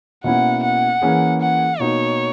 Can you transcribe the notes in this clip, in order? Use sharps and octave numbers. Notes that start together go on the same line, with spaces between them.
B2 A#3 C#4 E4 F#5
F#5
E3 A#3 C#4 G#4
F#5
B2 A#3 D#4 F#4 C#5